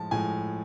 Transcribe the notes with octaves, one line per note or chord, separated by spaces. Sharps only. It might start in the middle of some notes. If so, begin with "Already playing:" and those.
Already playing: A2 F3 G#3 A5
A2 F3 G#3 G#5